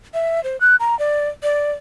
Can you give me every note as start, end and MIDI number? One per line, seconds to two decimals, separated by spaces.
0.14 0.43 76
0.44 0.59 72
0.61 0.76 90
0.80 0.97 82
0.99 1.28 74
1.43 1.72 74